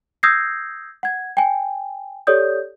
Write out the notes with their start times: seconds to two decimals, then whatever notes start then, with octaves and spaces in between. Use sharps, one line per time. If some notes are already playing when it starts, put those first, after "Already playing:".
0.23 D#6 E6 G6 G#6 A#6 C7
1.03 F#5 G#6
1.37 G5 G#5
2.27 G4 A4 C#5 D5 D#6 G6